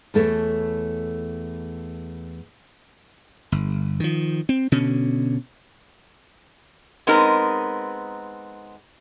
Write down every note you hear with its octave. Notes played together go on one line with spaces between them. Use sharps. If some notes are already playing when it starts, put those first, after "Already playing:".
E2 A3 A4 C#5
G1
D#3 F3
C4
B2 D3 C#4
G#3 B3 C4 D#4 A#4